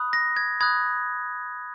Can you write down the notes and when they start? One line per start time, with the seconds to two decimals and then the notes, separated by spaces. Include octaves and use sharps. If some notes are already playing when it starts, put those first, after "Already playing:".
Already playing: B5 D#6 F#6
0.13 A#6
0.36 G#6
0.61 B5 D#6 F#6 G#6